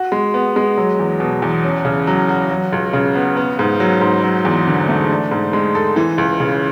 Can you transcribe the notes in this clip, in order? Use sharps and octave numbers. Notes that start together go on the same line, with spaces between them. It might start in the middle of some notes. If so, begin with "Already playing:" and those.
Already playing: F#4
G#3
B3
G#3
F#3
E2
B2
E2
C#4
C#3
F#3
F#4
F#3
C#2
C#3
B3
B3
G#2
F#3
G#2
F#3
E2
D3
A3
D4
G#2
G#3
A4
E3
C#2
C#3